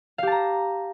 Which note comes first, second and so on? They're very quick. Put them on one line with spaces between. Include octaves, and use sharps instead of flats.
F5 G4 A5 A#5